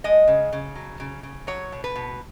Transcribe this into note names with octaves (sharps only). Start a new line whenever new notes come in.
G#3 D#5
C#3
C#3
F#3
C#3
C#3
F#3 C#5
B2
B4
B2